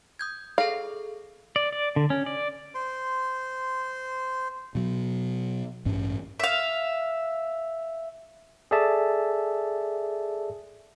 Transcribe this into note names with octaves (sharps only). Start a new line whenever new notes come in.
D#6 G6 G#6
G#4 A4 F5
D5
D5
D3
C#4
D5
C5 C6
B2 F#3
A1 G2 C#4
E5 F5
G#4 A4 D5 E5 A5